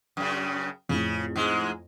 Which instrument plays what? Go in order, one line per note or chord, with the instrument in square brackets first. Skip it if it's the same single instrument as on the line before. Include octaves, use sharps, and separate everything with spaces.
[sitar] F#2 C#3
[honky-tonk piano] F2 A2 [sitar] C#3
[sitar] G#2 G#3